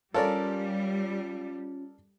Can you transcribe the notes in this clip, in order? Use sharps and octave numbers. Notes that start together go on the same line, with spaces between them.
G3 C#4 F4 A4 A#4 D5